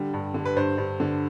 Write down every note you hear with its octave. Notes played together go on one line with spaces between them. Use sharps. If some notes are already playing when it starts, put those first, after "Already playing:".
Already playing: D3 G3
G2
D3
B4
G2 C5
G2
D3